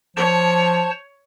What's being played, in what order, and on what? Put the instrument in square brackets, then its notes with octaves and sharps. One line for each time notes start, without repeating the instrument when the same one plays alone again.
[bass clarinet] F3 [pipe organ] C5 A5 [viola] C#5